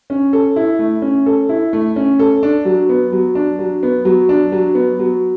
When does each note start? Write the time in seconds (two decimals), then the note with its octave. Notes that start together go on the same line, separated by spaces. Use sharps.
0.10 C#4
0.33 A4
0.56 E4
0.79 A3
1.02 C#4
1.26 A4
1.49 E4
1.73 A3
1.96 C#4
2.19 A4
2.43 D4
2.65 F#3
2.89 B3
3.12 F#3
3.35 D4
3.59 F#3
3.83 B3
4.05 F#3
4.29 D4
4.52 F#3
4.75 B3
4.99 F#3